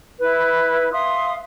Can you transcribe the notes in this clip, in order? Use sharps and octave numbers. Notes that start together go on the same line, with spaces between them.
E4 B4
E5 F5 C6 D#6